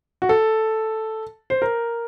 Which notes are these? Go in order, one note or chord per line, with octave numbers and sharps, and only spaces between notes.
F#4
A4
C5
A#4